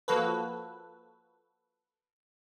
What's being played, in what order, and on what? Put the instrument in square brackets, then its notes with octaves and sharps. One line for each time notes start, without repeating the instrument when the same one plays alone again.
[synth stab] F3 A#3 F#4 A4 B4